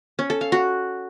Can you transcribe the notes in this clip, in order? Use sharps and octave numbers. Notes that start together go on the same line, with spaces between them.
C#4
A4
F5
F#4